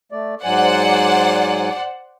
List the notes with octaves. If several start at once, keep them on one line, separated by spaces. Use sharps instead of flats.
A3 D5
G#2 F#3 C5 D5 F#5 G#5